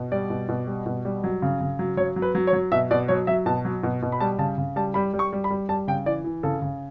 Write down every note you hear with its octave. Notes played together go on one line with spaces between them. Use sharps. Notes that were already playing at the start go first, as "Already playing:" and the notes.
Already playing: B2
G3 D5
B2
B2
G3
B2
G3
F#3
C#3
C#3
F#3
F#3 C#5
F#3
B4
F#3
C#5
F#3
B2 E5
B2 D5
F#3 C#5
F#3 E5
B2 A5
F#3
B2
B2
B5
G3 A5
C#3 A5
C#3
G3 A5
G3 B5
G3
C#6
G3
B5
G3
G3 A5
C#3 G5
E3 D5
E3
C#3 A4
C#3